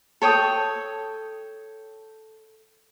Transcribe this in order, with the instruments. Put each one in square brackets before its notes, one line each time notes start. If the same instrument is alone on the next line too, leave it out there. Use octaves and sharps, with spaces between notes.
[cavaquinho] A4 C#5 G5 D#6